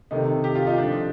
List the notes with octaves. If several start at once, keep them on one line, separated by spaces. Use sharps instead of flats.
C3 D#3 A3 D#4
G4
F4
D#4
D3 F3 A3 D4